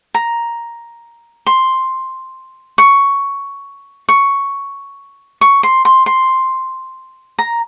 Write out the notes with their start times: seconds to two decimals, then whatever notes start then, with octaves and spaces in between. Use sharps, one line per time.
0.14 A#5
1.46 C6
2.78 C#6
4.09 C#6
5.41 C#6
5.63 C6
5.85 C6
6.06 C6
7.39 A#5